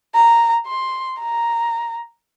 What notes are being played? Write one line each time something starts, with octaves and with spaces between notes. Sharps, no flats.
A#5
C6
A#5